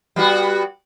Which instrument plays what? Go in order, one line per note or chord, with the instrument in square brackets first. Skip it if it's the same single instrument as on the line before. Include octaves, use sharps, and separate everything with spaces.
[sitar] G3 B3 F#4